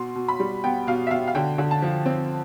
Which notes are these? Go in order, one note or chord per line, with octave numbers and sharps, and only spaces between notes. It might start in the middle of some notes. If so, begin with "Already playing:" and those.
Already playing: B2 C6
B2
B5
G3
B3 G5
B2 F5
E5
B2 F5
F5
D3 G5
D3
A5
F3
C4